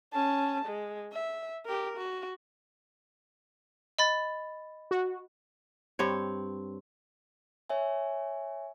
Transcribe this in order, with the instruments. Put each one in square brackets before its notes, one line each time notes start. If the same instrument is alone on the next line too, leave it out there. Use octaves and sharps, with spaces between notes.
[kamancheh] C#4 A5
G#3
E5
G4 A#4
F#4
[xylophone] D#5 B5 A6
[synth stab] F#4
[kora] G2 C4 C#5
[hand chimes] C#5 E5 G#5